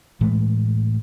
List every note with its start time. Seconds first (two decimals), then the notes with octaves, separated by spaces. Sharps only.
0.21 A2 E3 G#3 A3